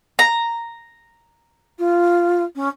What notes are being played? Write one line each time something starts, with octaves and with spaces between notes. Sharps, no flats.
A#5
F4
C#4